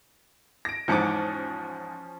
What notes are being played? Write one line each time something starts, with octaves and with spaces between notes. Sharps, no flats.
A#6 D7
E2 G#2 F3 C#4 D6 C#7